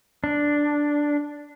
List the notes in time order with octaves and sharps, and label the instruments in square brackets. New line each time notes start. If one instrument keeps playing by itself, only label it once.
[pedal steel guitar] D4